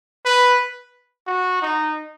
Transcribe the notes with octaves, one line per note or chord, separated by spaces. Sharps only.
B4
F#4
D#4